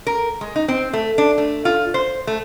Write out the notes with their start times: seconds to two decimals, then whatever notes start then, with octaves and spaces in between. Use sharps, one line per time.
0.07 A#4
0.41 G#3
0.56 D#4
0.68 C4
0.93 A3
1.18 D4
1.38 A3
1.65 F4
1.94 C5
2.27 A3